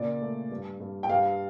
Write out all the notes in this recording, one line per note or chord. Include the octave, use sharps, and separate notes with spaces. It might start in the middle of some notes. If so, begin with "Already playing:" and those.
Already playing: A#2 C#3 D5
A3
G2
G2
G5
G2 F5